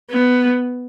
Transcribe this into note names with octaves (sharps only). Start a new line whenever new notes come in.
B3